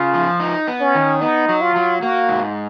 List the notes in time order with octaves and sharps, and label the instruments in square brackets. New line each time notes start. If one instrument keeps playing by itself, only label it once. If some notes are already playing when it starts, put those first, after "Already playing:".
Already playing: [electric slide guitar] C#3 [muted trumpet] F4
[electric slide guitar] F3
D#4
B3
[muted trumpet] C#4
[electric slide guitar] D#3
[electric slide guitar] B3 [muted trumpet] D#4
[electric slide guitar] F#3
[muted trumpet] F4
[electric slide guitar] F#3
[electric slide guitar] A#3 [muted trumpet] F#4
[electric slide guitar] G#2